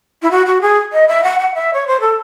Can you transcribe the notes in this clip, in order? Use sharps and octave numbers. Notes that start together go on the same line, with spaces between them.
E4
F#4
F#4
G#4
D#5
E5
F#5
F#5
E5
C#5
C5
A4